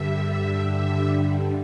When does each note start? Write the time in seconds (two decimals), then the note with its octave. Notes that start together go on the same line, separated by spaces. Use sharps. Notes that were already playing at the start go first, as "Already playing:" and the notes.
Already playing: G2 D3 G3 E5
0.70 E5